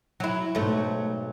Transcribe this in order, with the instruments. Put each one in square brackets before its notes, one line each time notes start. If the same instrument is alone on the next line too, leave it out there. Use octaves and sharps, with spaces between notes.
[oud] F#3 E4 [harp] D7
[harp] B1 G#2 [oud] F#3 A3